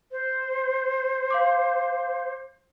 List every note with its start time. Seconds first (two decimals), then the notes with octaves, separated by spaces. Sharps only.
0.12 C5
1.30 F5 C6 D6